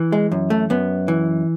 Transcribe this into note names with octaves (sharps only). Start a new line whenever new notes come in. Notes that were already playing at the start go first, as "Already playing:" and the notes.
Already playing: E3
G#3
F#2
A3
F#2 B3
E3